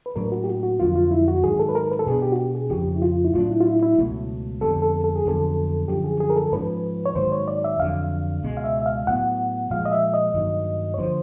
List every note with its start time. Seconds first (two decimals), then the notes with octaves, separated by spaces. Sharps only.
0.06 B4
0.16 A2 F#3 A#3 D4 A#4
0.32 F#4
0.44 G4
0.48 F#4
0.63 F#4
0.80 F2 D3 F#3 A#3 F4
0.96 F4
1.11 E4
1.28 F#4
1.43 G#2 D#3 F#3 G#4
1.59 A4
1.69 B4
1.75 A#4
1.91 B4
1.99 A4
2.07 B2 G3 B3 D4 G#4
2.22 G4
2.32 F#4
2.39 G4
2.55 G#4
2.70 F2 C#3 F3 G4
2.96 E4
3.02 F4
3.25 E4
3.34 A2 F#3 B3 D4 F4
3.50 E4
3.61 F4
3.66 E4
3.82 E4
3.98 C#2 B2 F#3 A3
4.61 F2 D3 G3 B3 A4
4.82 A4
5.04 A4
5.16 G#4
5.25 F2 D3 F#3 B3 A4
5.88 F#2 D3 F3 G4
6.04 G#4
6.20 G#4
6.30 A#4
6.36 A4
6.52 G#2 F3 A#3 C#4 B4
7.06 C#5
7.15 G#2 D#3 F#3 A#3 C5
7.32 C#5
7.48 D5
7.64 E5
7.79 F2 D3 F#3 F5
8.43 C#2 B2 G#3
8.57 F5
8.64 E5
8.82 E5
8.86 F5
9.06 A2 F#3 B3 F#5
9.70 A#2 F3 G#3 F5
9.86 D#5
9.92 E5
10.14 D#5
10.34 G2 D#3 F#3 A#3
10.94 C#5
10.98 D3 F3 A#3 C5